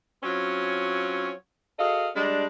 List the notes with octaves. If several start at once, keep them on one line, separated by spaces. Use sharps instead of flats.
F#3 C4 C#4 F4 C#5
F#4 G#4 A4 D#5 F5
G3 G#3 D4